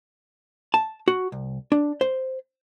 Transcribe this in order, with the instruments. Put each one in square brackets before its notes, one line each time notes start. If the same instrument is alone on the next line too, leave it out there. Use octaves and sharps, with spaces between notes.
[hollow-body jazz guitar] A5
F#4
C2
D4
C5